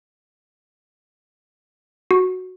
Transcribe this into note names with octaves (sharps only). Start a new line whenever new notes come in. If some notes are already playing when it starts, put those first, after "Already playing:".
F#4